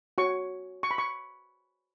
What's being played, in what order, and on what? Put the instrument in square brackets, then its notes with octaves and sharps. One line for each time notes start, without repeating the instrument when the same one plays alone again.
[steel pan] F#4 C#5 C#6
C#6
B5
C#6